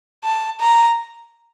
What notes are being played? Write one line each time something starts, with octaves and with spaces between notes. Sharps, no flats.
A5
A#5